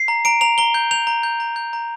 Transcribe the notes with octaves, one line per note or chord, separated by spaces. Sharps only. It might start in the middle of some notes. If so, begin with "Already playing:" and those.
Already playing: C7
A#5
A#5 D7
A#5 F7
A#5 G7
G6
G6 F7
A#5
G6
A#5
G6
A#5